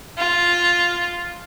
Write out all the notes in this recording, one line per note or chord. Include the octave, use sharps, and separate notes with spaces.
F4